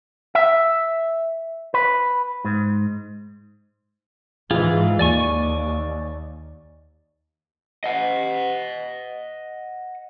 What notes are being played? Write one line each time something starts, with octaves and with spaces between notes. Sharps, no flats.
E5
B4
G#2
G#2 E3 F4 G#4
D#2 D5 G#5 C#6
D#5 F#5